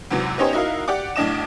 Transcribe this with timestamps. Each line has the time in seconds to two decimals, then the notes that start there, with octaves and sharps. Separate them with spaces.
0.11 E2 G#2 C3 E3 F#3
0.38 B3 C#4 D#4 G4 C5 C#5
0.53 D#4 E4 F#4 A#4 E5 F5
0.88 G4 D5 F#5 D6
1.16 B1 A2 D4 D#5 D6 E7